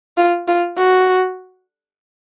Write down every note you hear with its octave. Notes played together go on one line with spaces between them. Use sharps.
F4
F4
F#4